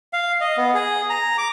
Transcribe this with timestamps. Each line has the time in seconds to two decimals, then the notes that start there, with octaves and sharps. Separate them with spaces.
0.13 F5
0.41 D#5
0.57 B3
0.74 G#4
1.10 A#5
1.38 D6